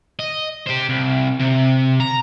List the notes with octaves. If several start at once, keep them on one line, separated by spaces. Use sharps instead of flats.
D#5
G4 C5
C2
C3
A#5